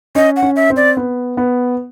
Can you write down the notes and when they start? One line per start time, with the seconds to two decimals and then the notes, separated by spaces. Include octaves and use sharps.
0.15 C#4 D#5
0.36 F#5
0.42 C#4
0.56 E5
0.70 C4
0.76 D5
0.97 B3
1.37 B3